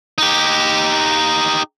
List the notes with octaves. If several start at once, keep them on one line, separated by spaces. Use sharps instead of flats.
D#4 G4